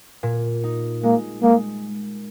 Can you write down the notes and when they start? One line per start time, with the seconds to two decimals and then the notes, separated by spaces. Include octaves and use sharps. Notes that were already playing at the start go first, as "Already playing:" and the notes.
0.23 A#2
0.64 D#4
1.03 G#3 A#3
1.43 G#3 A#3